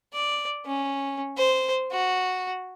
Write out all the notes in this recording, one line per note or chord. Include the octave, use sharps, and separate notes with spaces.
D5
C#4
C5
F#4